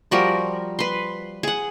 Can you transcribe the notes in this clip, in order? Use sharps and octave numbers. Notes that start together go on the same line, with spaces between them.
F3 G3 F#4 A#4
B4 C6
G#4 F#5